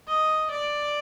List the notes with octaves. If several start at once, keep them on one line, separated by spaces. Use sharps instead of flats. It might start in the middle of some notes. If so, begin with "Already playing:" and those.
D#5
D5